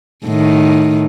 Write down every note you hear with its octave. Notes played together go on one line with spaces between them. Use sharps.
A2 D#3